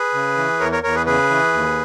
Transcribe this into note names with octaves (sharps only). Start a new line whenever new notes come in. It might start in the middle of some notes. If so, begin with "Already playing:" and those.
Already playing: G#4 B4
C#3
E3
E2 A#4 C#5
A#4 C#5
E2 A#4 C#5
G#4 B4
C#3 G#4 B4
E3
D#2